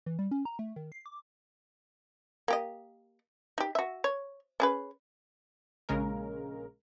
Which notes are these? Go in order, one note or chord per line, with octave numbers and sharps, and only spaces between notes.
E3
G3
C#4
A#5
A3
D#3
C7
D6
A#3 G4 D#5
D#4 G4
F#4 E5
C#5
C#4 G#4 B4
A#1 C#3 G#3 A#4